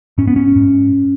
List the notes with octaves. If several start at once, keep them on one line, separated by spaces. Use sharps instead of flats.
G#2 C#4
B3
C#4
G#2